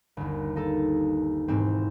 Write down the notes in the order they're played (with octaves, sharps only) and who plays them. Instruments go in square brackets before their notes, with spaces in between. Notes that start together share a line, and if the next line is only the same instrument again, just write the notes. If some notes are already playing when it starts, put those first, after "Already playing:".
[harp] G1 D#2
A#3 D#4 A4
E1 G#2 C4